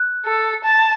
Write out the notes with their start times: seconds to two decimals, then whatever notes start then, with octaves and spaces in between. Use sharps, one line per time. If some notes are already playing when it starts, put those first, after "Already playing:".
Already playing: F#6
0.26 A4
0.64 A5